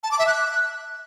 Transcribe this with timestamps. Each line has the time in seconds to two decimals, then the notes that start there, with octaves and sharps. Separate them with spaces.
0.03 A5
0.11 D6
0.19 E5
0.27 F#6